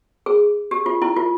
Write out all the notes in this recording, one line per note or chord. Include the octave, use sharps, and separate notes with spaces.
G#4
G4
F4
E4
F4